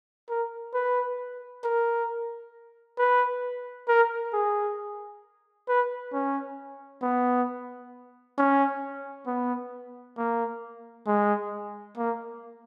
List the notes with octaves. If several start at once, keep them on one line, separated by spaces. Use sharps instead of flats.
A#4
B4
A#4
B4
A#4
G#4
B4
C#4
B3
C#4
B3
A#3
G#3
A#3